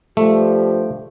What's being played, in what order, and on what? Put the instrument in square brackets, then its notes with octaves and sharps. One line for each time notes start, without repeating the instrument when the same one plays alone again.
[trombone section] G2 F3 D4 G4 [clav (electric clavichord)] A3